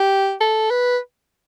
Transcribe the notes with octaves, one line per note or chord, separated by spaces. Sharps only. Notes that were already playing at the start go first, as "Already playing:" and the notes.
Already playing: G4
A4
B4